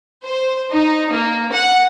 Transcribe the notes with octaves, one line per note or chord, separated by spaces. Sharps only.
C5
D#4
A#3
F#5